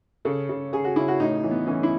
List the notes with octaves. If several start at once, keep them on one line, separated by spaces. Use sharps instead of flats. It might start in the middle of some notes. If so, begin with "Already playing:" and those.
C#3 A4
C#3
C#3 G#4
F#4
C#3 E4
F#4
A2 D#4
E3
B3
E3 C#4
E4